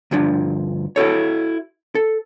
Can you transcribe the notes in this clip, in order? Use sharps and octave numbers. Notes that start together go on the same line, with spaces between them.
D2 G2 F3 D4
E4 F#4 A4 C#5
A4